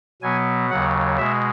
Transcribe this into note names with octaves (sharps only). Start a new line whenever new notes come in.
B2 F#3 B3 G#5
D#2 C#3 F#3 F#5
B2 G#3 E5